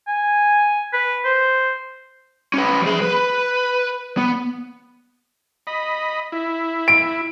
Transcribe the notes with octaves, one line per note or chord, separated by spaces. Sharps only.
G#5
B4
C5
C#4 B4
F3 G#4
B4
B3
D#5 B5
E4
D7